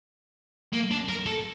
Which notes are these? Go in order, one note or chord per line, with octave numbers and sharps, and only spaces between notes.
A#3
D4
A#4
A4